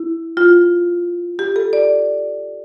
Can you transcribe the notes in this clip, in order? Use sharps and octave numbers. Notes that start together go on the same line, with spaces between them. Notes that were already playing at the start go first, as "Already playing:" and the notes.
Already playing: E4
F4
G4
A4
D5